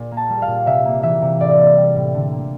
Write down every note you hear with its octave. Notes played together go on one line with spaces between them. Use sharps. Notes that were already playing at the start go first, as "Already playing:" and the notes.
Already playing: A#2
A#3
A5
G3
F5
A#2
C3 E5
A#3
E3 E5
C3
A2 D5
A#3
G3
A2
D3
A#3